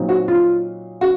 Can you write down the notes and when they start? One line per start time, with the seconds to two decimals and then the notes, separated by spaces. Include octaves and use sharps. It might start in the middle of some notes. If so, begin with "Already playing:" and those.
Already playing: A#2 F#3 C4 D#4
0.09 F#4
0.28 F4
1.01 F#4